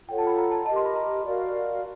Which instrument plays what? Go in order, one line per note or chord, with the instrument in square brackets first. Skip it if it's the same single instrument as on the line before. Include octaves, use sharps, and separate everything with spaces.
[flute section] F4 A4 C#5 F#5 [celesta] G5
[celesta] A5
B5
A#5
A5
[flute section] D#5 [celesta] A5
[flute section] G4 A#4
[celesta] C6
B5
A#5
[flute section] F#4 A#4 D5 F5